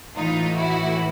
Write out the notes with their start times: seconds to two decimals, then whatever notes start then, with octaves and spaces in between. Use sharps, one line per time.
0.16 A2 E3 D#4 F4
0.57 E4 F#4